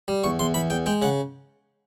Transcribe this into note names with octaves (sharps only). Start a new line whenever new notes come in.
G3
E2 C#6
E2 C6
E2 B5
E2 G5
G#3 G5
C#3 F#5